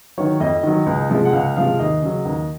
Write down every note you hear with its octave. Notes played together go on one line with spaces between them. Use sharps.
D#3 F#3 C#5
F2 D#5
D#3 F#3
C#2
C3 F3 G#3
F#5
C#2 F5
C3 F3 G#3 F5
D#2 D#5
C#3 F#3
D#2